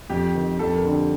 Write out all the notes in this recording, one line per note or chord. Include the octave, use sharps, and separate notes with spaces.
F2 G4
D#3
F2 A4
A#4
D3
G4